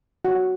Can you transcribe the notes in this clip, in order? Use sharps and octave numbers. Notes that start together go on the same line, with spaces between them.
F#4